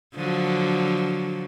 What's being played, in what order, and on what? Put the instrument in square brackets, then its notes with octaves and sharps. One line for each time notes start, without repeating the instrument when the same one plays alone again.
[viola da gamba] D3 F3 F#3